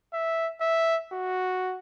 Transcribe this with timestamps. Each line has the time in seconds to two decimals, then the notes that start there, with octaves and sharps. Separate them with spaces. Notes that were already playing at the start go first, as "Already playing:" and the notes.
0.13 E5
0.61 E5
1.13 F#4